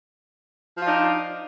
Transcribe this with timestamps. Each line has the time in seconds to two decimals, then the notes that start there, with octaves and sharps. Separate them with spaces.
0.76 F3
0.80 F4
0.83 D4
0.87 D#4